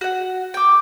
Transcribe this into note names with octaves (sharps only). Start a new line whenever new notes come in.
F#4 F#5
G5 D6